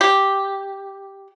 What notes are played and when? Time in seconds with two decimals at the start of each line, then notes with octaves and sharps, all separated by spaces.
0.01 G4